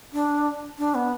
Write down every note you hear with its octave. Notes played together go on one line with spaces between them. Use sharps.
D4
D4
B3